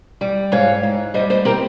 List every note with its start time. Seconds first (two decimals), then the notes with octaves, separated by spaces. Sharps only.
0.21 G3
0.52 G#2 C#5 F5
0.83 G#2
1.14 G3 C5 D#5
1.30 C5 D#5
1.45 C4 G4 A#4